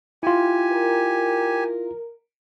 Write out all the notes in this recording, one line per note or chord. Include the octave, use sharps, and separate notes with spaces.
E4 F4 G4 G#5
A#4